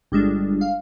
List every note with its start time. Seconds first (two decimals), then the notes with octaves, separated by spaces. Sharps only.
0.12 G1 G3 G#3 D4
0.61 F5